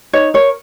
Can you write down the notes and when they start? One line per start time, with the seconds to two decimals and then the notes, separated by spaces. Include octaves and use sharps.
0.13 D#4 C#5
0.34 A#4 C#5